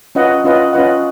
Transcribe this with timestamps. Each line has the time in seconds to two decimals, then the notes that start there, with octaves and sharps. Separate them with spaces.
0.15 C#4 F4 B4 D#5 F#5
0.44 C#4 F4 B4 D#5 F#5
0.73 C#4 F4 B4 D#5 F#5